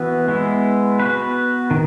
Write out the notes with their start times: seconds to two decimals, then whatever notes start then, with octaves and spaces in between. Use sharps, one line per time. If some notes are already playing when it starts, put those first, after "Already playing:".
Already playing: E3 B3 F#4 B4
0.28 G#3 B3 E4
1.00 B3 F#4 B4
1.71 D#3